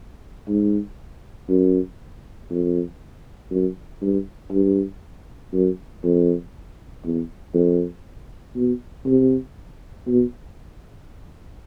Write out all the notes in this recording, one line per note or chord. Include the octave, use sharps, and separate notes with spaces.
G#2
F#2
F2
F#2
G2
G2
F#2
F2
E2
F2
B2
C3
B2